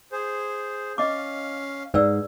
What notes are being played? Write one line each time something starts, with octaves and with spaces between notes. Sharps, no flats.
G#4 C5
C#4 D#5 F5 D6
G#2 B4 D5 E6